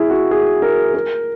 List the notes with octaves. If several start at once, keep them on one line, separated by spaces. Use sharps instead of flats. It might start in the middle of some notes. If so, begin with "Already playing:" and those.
Already playing: E4 G#4
F#4
G#4
A#4
A#4